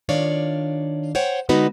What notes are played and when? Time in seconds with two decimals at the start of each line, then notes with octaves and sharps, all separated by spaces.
0.09 D#3 D4 F4 C#5 D5 F5
1.15 C5 C#5 F#5 G5
1.49 D3 G#3 B3 D#4 F#4 B4